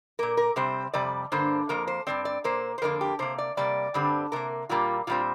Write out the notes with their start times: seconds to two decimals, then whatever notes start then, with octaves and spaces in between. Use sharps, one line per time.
0.19 A#2 A#3 A#4
0.37 A#4
0.56 C3 G3 C4 C5
0.94 F2 C3 G3 D5
1.32 G2 D3 A#3 C5
1.69 F2 F3 A#3 A#4
1.87 C5
2.07 G2 F3 C4 D5
2.25 D5
2.44 A#2 A#3 C5
2.78 C5
2.82 F2 D3 A#3 A#4
3.01 G4
3.19 C3 A#3 C5
3.38 D5
3.57 C3 G3 A#3 D5
3.94 G2 D3 G3 C4
4.32 C3 A#3 A#4
4.69 A#2 G3 A#3 F4
5.07 A#2 G3 C4 F4